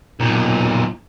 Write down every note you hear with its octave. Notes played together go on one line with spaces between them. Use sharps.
B1 A#2